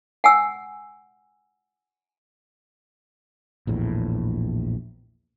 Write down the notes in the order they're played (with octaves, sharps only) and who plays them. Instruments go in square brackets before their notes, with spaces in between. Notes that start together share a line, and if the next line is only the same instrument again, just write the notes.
[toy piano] F#5 G#5 E6
[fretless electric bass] A#1 E2 A2